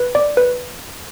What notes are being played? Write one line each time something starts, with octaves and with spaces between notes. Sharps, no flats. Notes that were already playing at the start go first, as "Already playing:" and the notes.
Already playing: B4
D5
B4